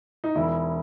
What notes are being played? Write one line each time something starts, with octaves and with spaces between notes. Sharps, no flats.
D#4
E1 E4